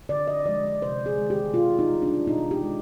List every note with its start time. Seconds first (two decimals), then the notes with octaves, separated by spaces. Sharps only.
0.09 D3 D5
0.28 D#5
0.46 F3 G#3 D5
0.82 C3 C5
1.06 G#4
1.18 D#3 G#3
1.30 G4
1.54 B2 F4
1.79 D#4
1.90 G3
2.02 D4
2.27 B2 D#4
2.51 G4
2.63 G#3